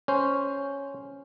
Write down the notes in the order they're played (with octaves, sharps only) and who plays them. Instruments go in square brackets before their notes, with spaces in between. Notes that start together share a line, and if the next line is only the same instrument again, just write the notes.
[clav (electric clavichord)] C#4 C5